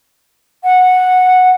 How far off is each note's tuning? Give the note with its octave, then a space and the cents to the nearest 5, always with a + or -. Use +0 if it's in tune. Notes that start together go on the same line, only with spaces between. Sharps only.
F#5 -10